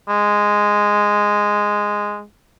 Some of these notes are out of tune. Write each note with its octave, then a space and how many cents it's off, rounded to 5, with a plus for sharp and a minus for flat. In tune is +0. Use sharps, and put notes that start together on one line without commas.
G#3 -5